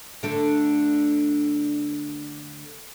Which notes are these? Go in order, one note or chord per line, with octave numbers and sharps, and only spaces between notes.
D3 A3 D4